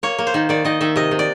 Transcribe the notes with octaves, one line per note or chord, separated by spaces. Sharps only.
A#3 C#5
A#3
C5
D#3
D#3 D5
D#3 D#5
D#3 E5
C3 D#5
C3
D5